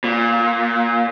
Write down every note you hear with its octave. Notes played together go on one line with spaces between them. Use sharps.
A#2